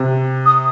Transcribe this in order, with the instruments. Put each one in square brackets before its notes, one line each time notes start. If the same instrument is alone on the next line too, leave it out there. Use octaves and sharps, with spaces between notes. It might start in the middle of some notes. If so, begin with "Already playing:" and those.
Already playing: [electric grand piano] C3
[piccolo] D#6